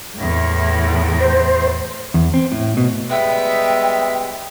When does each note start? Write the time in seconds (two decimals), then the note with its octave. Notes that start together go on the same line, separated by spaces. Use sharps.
0.16 E2 A2
1.21 C5
2.14 E2
2.34 C4
2.52 A2
2.77 B2
3.10 G3 G#3 B3 E5 G5